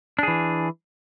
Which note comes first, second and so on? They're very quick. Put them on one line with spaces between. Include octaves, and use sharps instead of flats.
D4 G#4 E3